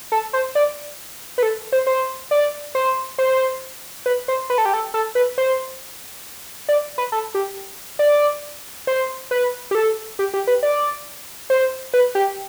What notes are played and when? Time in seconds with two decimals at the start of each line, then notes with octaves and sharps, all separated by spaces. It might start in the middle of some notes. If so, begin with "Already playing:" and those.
0.12 A4
0.33 C5
0.55 D5
1.38 B4
1.43 A4
1.72 C5
1.87 C5
2.31 D5
2.75 C5
3.18 C5
4.06 B4
4.28 C5
4.50 B4
4.58 A4
4.65 G4
4.74 A4
4.94 A4
5.15 B4
5.38 C5
6.69 D5
6.98 B4
7.12 A4
7.35 G4
7.99 D5
8.87 C5
9.31 B4
9.71 G4
9.75 A4
10.19 G4
10.34 G4
10.47 B4
10.63 D5
11.50 C5
11.94 B4
12.15 G4